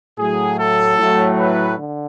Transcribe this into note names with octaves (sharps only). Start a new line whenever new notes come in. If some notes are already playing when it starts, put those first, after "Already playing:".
A2 F#3 A3 G#4
A4
A2 F#3 A3
B4
D3